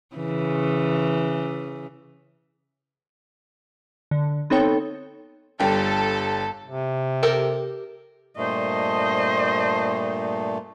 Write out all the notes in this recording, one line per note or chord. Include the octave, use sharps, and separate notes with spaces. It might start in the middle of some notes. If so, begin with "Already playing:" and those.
C#3 E3
D3
B3 C4 D#4 A4 C#5 G5
G1 G3 A4 G5
C3
G4 A4 A#4
G2 A#2 A3 C5 D#5